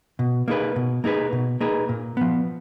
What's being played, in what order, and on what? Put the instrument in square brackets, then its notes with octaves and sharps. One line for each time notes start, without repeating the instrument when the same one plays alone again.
[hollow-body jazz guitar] B2
A#3 D#4 G#4 B4
B2
A#3 D#4 G#4 B4
B2
A#3 D#4 G#4 B4
A#2
F3 B3